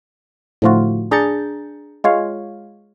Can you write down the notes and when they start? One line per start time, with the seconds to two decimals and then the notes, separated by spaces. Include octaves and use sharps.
0.62 A2 D3 F3 A3 F4 F#4
1.11 D4 G#4 A#5 G6 A6 C#7
2.04 G#3 F4 C#5 F5